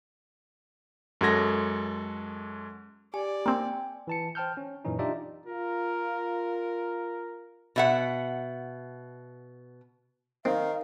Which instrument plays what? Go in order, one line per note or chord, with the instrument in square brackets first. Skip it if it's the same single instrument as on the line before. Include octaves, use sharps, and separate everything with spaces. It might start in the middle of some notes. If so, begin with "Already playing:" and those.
[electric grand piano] F#2 G#3 F#4 A4 G#6 A#6
[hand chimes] G4 G#5 [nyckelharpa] D5
[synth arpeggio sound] A#3 C4 [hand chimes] G5 G#5
[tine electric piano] E3 A5 C#7
C5 G5 A5 F6 G6
C#4
F#2 A#2 E3 C#4 D#4
D4 D#4 F4 G4 D5 E5
[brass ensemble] F4 A#4
[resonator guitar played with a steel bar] B2 E5 F#5
[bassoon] D#3 [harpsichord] C4 [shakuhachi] F5